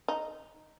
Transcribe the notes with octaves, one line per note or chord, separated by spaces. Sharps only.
D#4